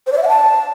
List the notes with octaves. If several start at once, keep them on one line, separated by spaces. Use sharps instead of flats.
C5
D5
E5
F#5
A5